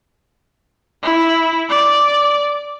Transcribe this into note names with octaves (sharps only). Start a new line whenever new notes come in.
E4
D5